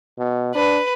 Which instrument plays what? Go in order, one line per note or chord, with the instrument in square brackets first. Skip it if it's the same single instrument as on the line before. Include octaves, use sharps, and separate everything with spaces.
[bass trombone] B2
[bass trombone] D4 [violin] B4